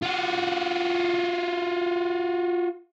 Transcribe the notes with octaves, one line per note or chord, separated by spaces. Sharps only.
F4 F#4